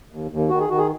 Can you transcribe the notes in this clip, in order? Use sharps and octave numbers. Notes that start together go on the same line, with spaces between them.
D#2
D#2
D#3 F#4
G#4
D#3 F#4
G#4